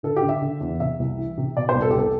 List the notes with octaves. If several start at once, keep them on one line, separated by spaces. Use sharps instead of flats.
D3 A4
G4
D3
E5
D3
E2
C3 E5
C2
E3
C3
B2 D5
C5
C2
A4
G4
C2 A4